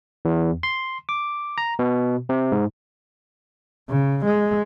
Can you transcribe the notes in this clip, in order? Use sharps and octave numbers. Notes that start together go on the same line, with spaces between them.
E2
C6
D6
A#5
B2
C3
G#2
C#3
G#3